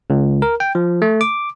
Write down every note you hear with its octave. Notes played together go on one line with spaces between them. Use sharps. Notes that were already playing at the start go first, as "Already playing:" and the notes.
C#2
A#4
G5
F3
A3
D6